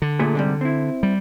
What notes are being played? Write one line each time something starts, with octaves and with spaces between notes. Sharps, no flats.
D3
A#2 A3 G#4
G#2 C3 G3
C4 E4
G3